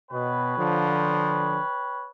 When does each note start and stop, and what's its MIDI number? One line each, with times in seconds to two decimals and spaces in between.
0.12 0.52 47
0.12 2.08 71
0.12 2.08 73
0.12 2.08 79
0.57 1.58 50
0.57 1.58 53